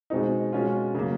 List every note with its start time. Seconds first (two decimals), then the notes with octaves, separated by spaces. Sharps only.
0.10 B2 G#3 C4 D#4
0.52 B2 G#3 C#4 F4
0.94 C#3 F#3 A#3